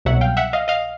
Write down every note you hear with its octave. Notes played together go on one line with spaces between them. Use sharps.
C2 B2 F#3 E5 F#5
F5 G5
E5 F#5
D#5 F5
D#5 F5